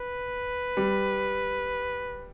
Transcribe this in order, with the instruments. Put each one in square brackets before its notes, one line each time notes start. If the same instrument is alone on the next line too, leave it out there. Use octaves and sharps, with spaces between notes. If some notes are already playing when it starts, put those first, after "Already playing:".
Already playing: [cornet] B4
[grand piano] G3